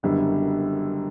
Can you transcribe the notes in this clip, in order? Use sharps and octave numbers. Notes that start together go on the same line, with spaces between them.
F#1 F#2 D3 G3 B3